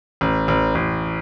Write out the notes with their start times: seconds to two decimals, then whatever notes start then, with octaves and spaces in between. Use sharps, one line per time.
0.21 A1
0.48 A1
0.75 A1